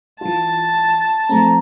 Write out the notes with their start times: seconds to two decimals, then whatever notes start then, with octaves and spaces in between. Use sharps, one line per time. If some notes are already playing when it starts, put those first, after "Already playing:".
0.21 E3 F4 A5
1.29 F3 A3 C4 A#5